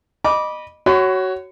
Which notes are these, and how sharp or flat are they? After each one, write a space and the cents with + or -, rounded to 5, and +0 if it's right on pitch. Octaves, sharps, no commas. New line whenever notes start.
D#5 -20 B5 -20 D6 -10
F#4 +20 C#5 +0 B5 +45